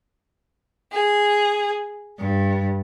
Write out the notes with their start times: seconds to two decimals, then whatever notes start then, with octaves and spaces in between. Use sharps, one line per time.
0.92 G#4
2.17 G2